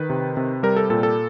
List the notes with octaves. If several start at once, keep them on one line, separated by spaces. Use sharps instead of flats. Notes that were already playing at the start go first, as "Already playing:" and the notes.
Already playing: D#3 B4
C3
C3
G3 A#4
A4
A#2 A4
A4